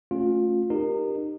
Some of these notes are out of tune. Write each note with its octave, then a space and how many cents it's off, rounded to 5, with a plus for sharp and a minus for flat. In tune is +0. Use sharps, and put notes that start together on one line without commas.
A3 +0 C#4 -10 F4 +20
D#4 -30 G4 +0 A#4 +0